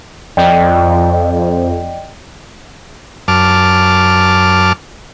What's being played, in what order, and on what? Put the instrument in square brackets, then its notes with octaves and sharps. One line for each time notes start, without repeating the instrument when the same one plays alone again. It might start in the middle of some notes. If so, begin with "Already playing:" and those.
[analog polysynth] F2 [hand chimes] D5 D#5 G5
[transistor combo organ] F#2 A5 D6 F6